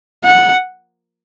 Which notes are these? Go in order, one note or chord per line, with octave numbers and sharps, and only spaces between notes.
F#5